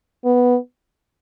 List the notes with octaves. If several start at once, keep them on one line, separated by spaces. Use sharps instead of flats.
B3